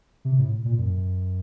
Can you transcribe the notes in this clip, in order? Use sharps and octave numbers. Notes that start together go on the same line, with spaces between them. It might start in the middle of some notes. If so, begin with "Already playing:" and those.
C3
A2
A#2
F#2